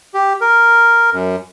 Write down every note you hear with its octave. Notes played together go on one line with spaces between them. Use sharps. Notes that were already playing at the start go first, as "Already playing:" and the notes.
G4
A#4
F#2